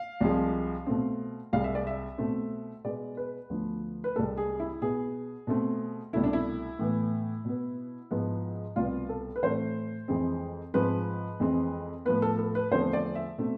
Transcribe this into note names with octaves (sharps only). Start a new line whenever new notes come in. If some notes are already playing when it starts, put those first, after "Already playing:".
Already playing: F5
C2 C3 F3 G#3
B2 A3 C4
C2 C3 G#3 F5
E5
D5
E5
B2 A3 C4
B2 G#3 B3 D5
B4
D2 D3 F3 B3
B4
C2 C3 G#3 A4
G#4
E4
B2 B3 G#4
B2 A3 C4
C2 B2 A3 E4
D4
E4
A2 E3 B3
B2 B3
G#2 F3 B3
C2 B2 B3 F4
A4
B4
A2 E3 A3 C4 C5
F2 E3 G#3 C4
G#2 F3 G#3 C4 B4
F2 E3 G#3 C4
A2 F3 B3 B4
A4
A4
B4
E2 D3 F3 A3 C4 C5
D5
E5
B2 A3 C4